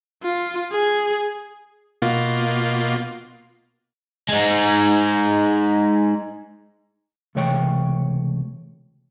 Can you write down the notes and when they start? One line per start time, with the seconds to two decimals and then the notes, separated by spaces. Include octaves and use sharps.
0.23 F4
0.71 G#4
2.02 B2 A#3 F4
4.29 G#3 D#4
7.35 C#2 C3 E3 A3 C#5 G5